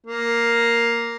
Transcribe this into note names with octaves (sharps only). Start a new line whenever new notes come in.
A#3